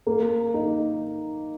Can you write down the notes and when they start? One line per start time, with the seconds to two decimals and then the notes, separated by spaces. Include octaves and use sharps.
0.07 A#3
0.54 D#4